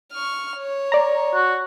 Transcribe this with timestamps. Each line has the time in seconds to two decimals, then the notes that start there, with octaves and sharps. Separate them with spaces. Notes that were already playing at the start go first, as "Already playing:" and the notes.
0.13 C#6 F6
0.57 C#5
0.92 D5 A#5
1.34 F#4